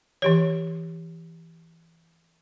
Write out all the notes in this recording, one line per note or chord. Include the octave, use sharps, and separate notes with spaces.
E3 G4 C#5